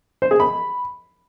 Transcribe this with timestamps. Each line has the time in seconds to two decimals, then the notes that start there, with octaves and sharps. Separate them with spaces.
0.22 C5
0.31 G#4
0.40 B5